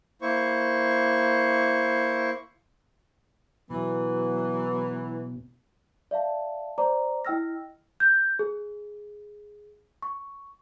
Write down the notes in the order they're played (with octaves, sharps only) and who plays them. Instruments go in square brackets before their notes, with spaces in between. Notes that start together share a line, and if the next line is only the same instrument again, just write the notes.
[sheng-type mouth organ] A#3 E4 C5 C#6
[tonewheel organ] B2 [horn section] E3 [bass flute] F#3 [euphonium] B3
[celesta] D5 E5 F5 A5
C5 D5 A#5 D6
E4 D#5 G5 E6 F6 A#6
G6
G#4
C#6